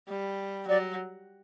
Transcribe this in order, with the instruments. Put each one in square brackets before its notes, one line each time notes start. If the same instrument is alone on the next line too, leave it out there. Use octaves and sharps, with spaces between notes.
[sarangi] G3
[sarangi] F#3 [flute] D5